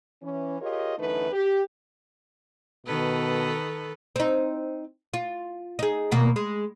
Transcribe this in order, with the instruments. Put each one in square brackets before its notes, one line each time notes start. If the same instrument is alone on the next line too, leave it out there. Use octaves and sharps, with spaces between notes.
[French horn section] E3 C#4
F4 G4 G#4 A#4 C#5 D#5
F#2 D3 E3 A3 D#4 B4
G4
[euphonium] B2 [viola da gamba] D#3 A4 B4
[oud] C4 D#4
F4
D#4 G#4
D#2 B2 A#3
G#3